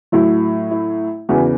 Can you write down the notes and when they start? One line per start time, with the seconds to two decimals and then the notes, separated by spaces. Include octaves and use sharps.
0.12 A2 F#3 E4
0.71 E4
1.29 E2 C#3 E3 F#4